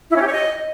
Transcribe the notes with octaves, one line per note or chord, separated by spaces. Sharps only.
E4
C#4
G4
C#5
D#5